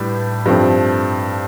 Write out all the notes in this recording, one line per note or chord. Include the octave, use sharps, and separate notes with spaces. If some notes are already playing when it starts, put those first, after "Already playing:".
Already playing: A2 G3 D4 B4
G2 F3 A3 C4